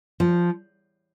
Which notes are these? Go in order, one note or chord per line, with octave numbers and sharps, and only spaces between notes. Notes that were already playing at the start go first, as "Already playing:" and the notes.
F3